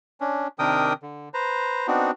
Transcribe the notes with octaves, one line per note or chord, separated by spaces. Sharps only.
C#4 D4
C3 D#3 D4 A#4 G5 D#6
D3
B4 C5 A#5
B3 C4 D4 D#4 F#4